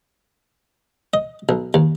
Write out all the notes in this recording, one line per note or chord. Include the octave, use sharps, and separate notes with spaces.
D#5
B1
D#2